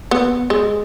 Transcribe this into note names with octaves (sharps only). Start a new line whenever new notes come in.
B3
G#3